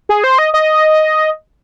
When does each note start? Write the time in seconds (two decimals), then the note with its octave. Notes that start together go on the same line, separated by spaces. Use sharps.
0.09 G#4
0.24 C5
0.39 D#5
0.54 D#5